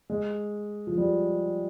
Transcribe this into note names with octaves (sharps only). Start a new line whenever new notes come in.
G#3
F3
G3